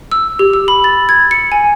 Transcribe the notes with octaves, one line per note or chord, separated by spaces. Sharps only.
E6
G4
E6
B5
A6
G#6
C#7
G#5